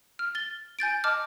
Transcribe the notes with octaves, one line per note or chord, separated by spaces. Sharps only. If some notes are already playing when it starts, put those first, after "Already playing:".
F6
A6 G7
G#5 G6 A6 D7
D#5 A5 D6 F6